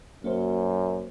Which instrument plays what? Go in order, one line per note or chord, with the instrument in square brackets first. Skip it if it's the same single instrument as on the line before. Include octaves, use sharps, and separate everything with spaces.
[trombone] F#2 [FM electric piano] A#3 F#4 C5